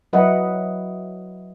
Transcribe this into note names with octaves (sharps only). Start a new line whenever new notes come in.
F#3 E4 B4 D#5 F#5